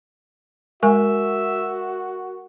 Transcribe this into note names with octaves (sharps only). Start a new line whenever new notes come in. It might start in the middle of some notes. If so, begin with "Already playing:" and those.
G#3 F#4 A#4 E5 G#5 C#6